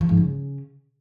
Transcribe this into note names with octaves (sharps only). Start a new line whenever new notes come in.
F3
G#2
C#3